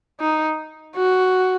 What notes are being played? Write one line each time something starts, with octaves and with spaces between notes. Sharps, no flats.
D#4
F#4